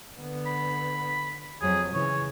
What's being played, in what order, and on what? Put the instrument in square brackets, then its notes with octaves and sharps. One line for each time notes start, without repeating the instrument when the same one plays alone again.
[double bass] D3 B3
[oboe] B5
[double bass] F2 F#3 [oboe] G#4
[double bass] C#3 E3 [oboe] C#5